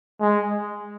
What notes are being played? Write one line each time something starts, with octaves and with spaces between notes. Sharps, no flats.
G#3